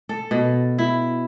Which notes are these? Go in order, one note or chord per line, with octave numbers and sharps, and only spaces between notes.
A4
B2
E4